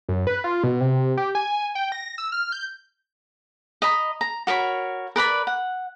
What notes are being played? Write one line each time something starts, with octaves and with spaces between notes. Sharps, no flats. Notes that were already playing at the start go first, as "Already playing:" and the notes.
F#2
B4
F4
B2
C3
G4
G#5
G5
A#6
E6
F6
G6
D#5 A#5 B5
A#5
F#4 A#4 C#5 B5
A#4 B4 D5 B5
F#5